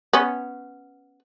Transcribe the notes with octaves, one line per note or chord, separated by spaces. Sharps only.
B3 C#4